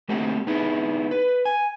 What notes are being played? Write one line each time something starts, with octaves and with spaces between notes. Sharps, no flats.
A3 A#3 C4 F#4 G4 A#4
B3 D#4 E4 G#4
B4
G#5